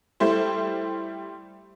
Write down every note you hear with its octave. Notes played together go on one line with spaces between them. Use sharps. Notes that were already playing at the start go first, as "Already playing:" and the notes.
G3 A3 E4 C5